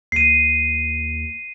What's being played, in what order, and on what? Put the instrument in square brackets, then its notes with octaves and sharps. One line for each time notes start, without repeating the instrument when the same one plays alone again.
[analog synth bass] D#2 [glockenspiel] C7 D#7